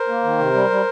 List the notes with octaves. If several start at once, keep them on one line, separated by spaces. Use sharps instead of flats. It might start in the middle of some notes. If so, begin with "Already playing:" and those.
Already playing: A#4 C5
A#3
D#3
C3
G3
G3